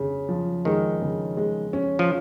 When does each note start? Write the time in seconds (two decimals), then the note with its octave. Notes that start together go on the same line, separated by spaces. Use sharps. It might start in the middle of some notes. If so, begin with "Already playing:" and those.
Already playing: C#3
0.29 F3
0.65 D#3 G#3
1.02 C#3
1.37 G#3
1.73 C#4
1.99 F3